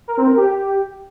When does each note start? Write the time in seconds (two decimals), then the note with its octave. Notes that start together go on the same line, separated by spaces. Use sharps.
0.08 A#4
0.18 C4
0.28 A#4
0.38 G4